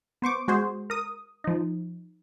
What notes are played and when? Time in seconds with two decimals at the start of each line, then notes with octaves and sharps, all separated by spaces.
0.22 B3 C5 C#6 D6
0.48 G#3 F#4 G#4 C5
0.90 A#4 D#6
1.44 F3 D#4